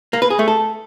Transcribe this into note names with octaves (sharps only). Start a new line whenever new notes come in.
A#3
B4
G#4
A3
A4